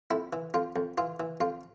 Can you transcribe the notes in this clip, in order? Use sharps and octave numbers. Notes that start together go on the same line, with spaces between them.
F2 E4
E3
F2 F4
F2
E3 F4
E3
F2 F4